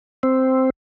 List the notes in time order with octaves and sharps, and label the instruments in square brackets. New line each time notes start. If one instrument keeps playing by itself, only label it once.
[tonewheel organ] C4